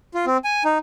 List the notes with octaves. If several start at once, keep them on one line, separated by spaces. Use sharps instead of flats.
F4
C4
G#5
D#4